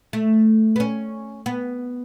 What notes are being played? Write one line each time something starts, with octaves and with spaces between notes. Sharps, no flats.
A3
B3
C#4
B3